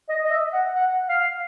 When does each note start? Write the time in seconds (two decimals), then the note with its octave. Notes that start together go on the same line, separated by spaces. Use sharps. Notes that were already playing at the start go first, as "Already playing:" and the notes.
0.09 D#5
0.24 D#5
0.30 E5
0.53 F#5
0.75 F#5
1.09 F5